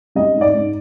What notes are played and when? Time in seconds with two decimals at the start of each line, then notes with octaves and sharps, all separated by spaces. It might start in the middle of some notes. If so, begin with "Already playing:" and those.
0.15 G3 D#5
0.34 G#2
0.41 D5
0.53 G#2